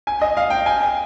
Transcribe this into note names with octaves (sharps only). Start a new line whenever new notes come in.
G#5
D#5
F5
G5
G#5